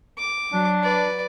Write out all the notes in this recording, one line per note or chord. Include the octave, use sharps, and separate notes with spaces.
D6
F#3 D4
B4 D5